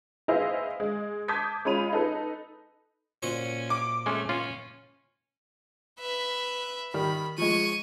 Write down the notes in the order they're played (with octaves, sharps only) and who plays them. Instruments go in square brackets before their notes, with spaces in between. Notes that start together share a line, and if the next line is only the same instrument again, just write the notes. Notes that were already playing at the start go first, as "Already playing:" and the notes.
[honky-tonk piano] E4 G#4 B4 C5 D#5 F5
G#3
A5 D6 D#6 G6 G#6 B6
G#3 C#4 F4 B5 D#7 F7
D#4 A4 B4
[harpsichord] A#2 F#4 C5 [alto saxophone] C#4
[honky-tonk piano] D6
[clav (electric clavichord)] G#3 C#4 [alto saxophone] A3
[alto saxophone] C#4 [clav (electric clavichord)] F4
[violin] B4 E5
[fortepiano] D#3 G3 F6 [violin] B5
[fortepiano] F3 G#3 [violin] C#6 D#7